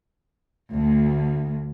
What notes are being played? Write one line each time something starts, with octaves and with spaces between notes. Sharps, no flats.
D2